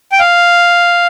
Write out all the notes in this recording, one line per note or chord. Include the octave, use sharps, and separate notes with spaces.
G5
F5